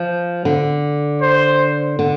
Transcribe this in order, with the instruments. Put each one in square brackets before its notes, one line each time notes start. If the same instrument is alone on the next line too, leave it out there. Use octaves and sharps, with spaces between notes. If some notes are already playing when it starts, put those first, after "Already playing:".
Already playing: [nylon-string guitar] F3
D3
[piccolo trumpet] C5
[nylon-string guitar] D3